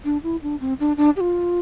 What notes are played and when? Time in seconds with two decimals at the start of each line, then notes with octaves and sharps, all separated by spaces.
0.05 D4
0.23 E4
0.43 D4
0.60 C4
0.80 D4
0.97 D4
1.17 G4
1.21 F4